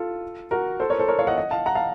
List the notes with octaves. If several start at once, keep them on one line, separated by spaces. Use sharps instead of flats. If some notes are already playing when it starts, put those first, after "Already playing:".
Already playing: F4 A4
F#4 A#4
A4 C5
A#4 C#5
A4 C5
A#4 C#5
C#5 F5
D#5 F#5
D#5 F#5
F5 A5
F#5 A#5
F5 A5